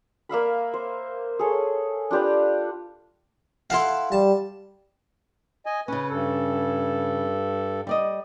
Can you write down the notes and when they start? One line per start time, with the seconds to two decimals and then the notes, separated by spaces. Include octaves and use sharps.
0.29 A#3 E5 F5 B5
0.74 C5
1.39 G#4 A4 C#5
2.11 D4 F4 G4 B4
3.70 E4 A4 F5 F#5 C6
4.12 G3 A5
5.66 D#5 G#5
5.88 C#3 C#4 B4
6.09 G2 A4
7.87 G3 D5 D#5